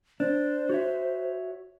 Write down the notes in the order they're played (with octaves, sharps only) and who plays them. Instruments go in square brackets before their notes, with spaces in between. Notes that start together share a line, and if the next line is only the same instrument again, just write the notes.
[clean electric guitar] D4 [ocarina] C5
[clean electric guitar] F#4 C#5 E5